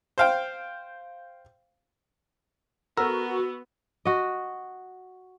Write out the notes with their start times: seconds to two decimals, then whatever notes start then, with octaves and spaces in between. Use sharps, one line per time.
0.18 C5 F5 G5
2.97 B3 F#4 A4 A#4 E6
4.05 F#4 D#5